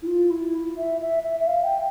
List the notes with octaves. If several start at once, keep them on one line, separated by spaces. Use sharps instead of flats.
E4
F4
E4
E5
E5
E5
E5
F5
G5